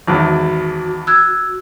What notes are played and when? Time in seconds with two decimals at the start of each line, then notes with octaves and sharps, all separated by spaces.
0.07 G#1 E2 F#4
1.07 E6 F#6 G#6